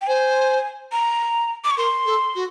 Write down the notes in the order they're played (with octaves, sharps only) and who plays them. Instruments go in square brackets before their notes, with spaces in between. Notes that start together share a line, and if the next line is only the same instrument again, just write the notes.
[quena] G5
[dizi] C5 [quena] G#5
[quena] A#5
D6
C#6
[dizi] A#4 [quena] C6
[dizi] A4
F#4